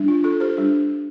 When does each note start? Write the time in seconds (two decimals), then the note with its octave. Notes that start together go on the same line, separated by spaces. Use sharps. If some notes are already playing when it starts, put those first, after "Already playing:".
Already playing: G3 D4
0.08 F4
0.24 F4 A4
0.40 G4 C5
0.57 G3 D4